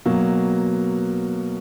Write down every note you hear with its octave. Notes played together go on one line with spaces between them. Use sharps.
B2 F#3 A#3